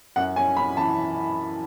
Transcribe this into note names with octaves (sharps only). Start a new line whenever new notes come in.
F#2 F#5
C#4 G#5
C#4 B5
E3 A5